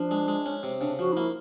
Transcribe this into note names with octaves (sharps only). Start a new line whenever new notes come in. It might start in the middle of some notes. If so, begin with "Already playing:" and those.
Already playing: F3 D4
G#3
G#3
C#4
C3
C#3 D4
F3 F#4
D#4
A#3 E4